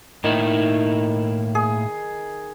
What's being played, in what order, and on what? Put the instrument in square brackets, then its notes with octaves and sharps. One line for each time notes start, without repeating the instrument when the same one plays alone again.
[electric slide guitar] A2 A#3 E4 [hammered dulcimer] D#3
[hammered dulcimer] G#4